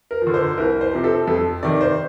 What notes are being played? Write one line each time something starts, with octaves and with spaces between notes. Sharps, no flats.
A#4
F3
D3
C5
C2 A#4
C5
C3 F3
A4
F2 A4
C3 D#3 D5
C5